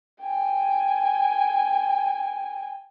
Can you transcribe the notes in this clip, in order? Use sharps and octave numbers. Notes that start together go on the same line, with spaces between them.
G5 G#5